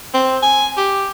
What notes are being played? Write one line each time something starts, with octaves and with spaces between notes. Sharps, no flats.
C4
G#5
G4